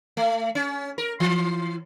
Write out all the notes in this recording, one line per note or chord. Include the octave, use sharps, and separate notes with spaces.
A3
C#4
A#4
E3